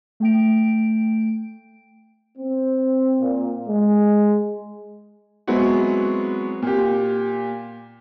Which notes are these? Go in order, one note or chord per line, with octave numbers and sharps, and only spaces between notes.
A3 G5 D7
C4
A#2
G#3
F#3 G#3 B3 C4 E4 F#4
A#2 G4